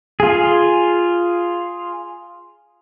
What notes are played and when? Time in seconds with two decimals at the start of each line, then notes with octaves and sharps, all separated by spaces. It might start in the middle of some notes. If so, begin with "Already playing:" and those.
0.20 F4 G#4